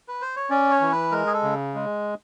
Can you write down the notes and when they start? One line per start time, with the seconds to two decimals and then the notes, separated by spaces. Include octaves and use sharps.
0.08 B4
0.22 C5
0.36 C#5
0.50 C#4 D5
0.70 C#5
0.81 E3
0.92 B4
1.11 G#3 A#4
1.27 G#4
1.33 A4
1.43 C#3
1.75 G#3